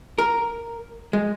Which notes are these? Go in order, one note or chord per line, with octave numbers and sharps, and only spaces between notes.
A#4
G#3